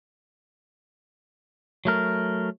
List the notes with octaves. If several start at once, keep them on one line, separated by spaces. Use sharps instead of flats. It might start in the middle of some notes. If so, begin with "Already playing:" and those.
F#3 A3 A#4